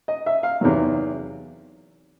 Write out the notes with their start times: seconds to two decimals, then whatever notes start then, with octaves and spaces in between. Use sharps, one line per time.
0.08 D#5
0.26 E5
0.43 F5
0.61 E2 C3 D#3 F#3